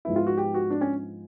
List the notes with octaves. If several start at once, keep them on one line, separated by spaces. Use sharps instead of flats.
G#2 F3 G#3 B3 E4
F4
F#4
G4
F#4
D4
C#4